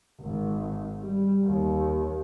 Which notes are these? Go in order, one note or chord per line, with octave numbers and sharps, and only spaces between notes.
G#1
G3
D#2